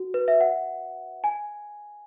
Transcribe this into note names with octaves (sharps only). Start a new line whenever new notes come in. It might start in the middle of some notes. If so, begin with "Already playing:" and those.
Already playing: F#4
B4
E5
F#5
G#5